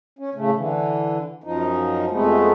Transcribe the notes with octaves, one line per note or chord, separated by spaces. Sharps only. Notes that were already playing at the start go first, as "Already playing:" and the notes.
C#4
A2 C#3 A3
D3 E3
F#2 F3 D#4
F2 C3 G#3 A3 B3